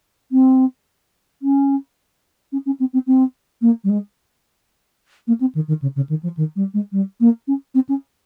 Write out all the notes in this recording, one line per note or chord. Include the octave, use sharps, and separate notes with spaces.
C4
C#4
C#4
C#4
C4
C4
C4
A#3
G3
G#3
A#3
C4
D#3
D#3
C#3
C#3
D#3
F3
D#3
G3
G#3
G3
A#3
C#4
C4
C#4